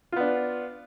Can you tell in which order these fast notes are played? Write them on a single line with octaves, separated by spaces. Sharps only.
F4 B3 D4